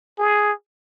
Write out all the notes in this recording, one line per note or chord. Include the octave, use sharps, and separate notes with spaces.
G#4